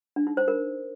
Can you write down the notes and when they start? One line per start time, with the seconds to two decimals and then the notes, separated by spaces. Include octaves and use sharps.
0.16 D4
0.27 D#4
0.37 C5
0.48 A#4